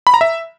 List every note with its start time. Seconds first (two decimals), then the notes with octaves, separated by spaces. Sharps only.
0.07 B5
0.14 A#5
0.21 E5